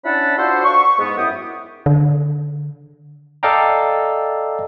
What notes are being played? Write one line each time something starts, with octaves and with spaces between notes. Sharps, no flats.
C#4 D4 E4 F#5 A5 B5
D4 F4 F#4 A4 C5
C#6
G#2 B3
F#2 E4 F#4 G4 D#6
D3
A4 D5 D#5 F5 G5 A#5